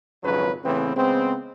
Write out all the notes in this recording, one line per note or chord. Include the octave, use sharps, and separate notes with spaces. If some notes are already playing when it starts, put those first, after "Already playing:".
G#1 F2 C#3 F#3 C#4 B4
A2 C#3 E3 B3 C4
C#3 G#3 B3 C4